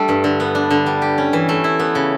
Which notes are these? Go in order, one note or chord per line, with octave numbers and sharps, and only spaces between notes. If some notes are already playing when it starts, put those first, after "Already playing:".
Already playing: G3 A3 D4 A4
G2
D3
B3
D4
D3
G3
G4
C#4
E3
A3
E4
B3
C#3